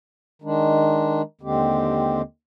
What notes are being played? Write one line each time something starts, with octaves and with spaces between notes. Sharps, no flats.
D#3 G#3 D4
D#2 D3 G#3 C4 G4